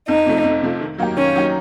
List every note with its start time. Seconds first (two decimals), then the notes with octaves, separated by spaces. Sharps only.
0.08 F2 D#4
0.26 C3 F3 A3
0.44 F2
0.62 C3 F3 A3
0.81 D#3
0.98 F#3 A#3 D#4 G4
1.17 D#3 C#4
1.35 F#3 A#3 D#4 G4